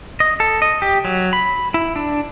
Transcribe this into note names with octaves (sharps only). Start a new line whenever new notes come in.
D#5
A4
D#5
G4
F#3
B5
E4
D4